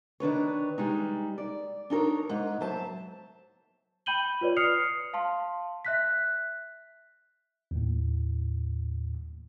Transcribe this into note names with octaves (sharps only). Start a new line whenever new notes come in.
D#3 D4 B4 C#5
G3 G#3 D#4
D5
D4 D#4 A4 A#4 C#5
G#2
F#3 C5 E5 A5
G5 B5 G6 D#7 F#7 G7
F4 B4 C#5 D5
D#6 F6 C7 C#7 F7
F5 A5 C6
E5 F#6 B6
D#2 A2